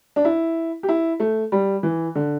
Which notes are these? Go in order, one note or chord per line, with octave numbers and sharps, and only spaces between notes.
D4
E4
G4
E4
A3
G3
E3
D3